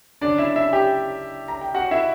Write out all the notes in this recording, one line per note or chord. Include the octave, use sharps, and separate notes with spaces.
F#1 F#2 D3 D4 D5
E4 E5
E4 E5
G4 G5
A#5
G5
F#4 F#5
E4 E5